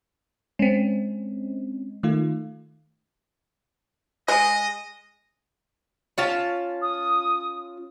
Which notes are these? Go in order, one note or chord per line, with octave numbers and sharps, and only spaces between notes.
G#3 C4 C#4
D#3 A3 F4
G#3 D#5
C#4 F4 A5
D#6